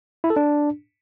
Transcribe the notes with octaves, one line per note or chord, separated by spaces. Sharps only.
E4
A4
D4